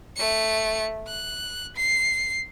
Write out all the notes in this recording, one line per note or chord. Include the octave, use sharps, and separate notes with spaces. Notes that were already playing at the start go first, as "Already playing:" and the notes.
A3 C#7
F#6
C7